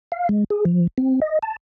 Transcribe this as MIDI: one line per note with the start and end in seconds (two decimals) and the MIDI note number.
0.12 0.29 77
0.29 0.44 56
0.50 0.65 68
0.65 0.87 53
0.98 1.20 60
1.22 1.39 75
1.43 1.56 81